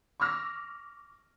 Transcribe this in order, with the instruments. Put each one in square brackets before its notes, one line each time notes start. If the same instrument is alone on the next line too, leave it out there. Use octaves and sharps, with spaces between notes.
[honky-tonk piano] C#6 D6 E6 F6 A#6